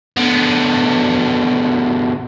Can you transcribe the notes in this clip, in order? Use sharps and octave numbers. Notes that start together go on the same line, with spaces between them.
B2 D3